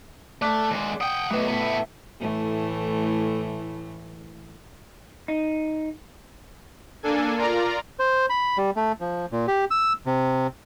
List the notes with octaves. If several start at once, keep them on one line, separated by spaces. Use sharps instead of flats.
A3 D5 D6 F#6
D#2 G#3
F#5 G5 D#6
B2 F#3 A3 B4
A2 B3
E5
A2 E3 A3
D#4
A#3 D4 A4 G#5
F4 A#4 D5 A#5
C5
B5
G3
A3
F3
A#2
G4
E6
C3